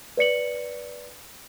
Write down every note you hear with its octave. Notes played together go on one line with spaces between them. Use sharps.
B4 D5 C#7 F#7